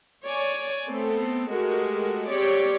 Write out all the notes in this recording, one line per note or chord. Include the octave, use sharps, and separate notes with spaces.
C#5 D5 G#5
A3 B3 C4 A4
G#3 A3 F#4 G4 A#4
C4 G4 C#5 D5